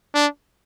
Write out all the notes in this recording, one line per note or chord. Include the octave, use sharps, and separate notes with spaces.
D4